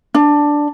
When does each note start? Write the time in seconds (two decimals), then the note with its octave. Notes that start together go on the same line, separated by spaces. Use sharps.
0.14 D4